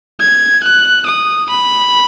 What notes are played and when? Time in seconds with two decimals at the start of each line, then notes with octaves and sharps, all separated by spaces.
0.21 G#6
0.64 F#6
1.07 D#6
1.49 B5